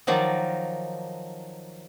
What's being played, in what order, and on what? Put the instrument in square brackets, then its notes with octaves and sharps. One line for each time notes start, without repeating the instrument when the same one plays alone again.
[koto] D#3 F3 F#3 D#4 D5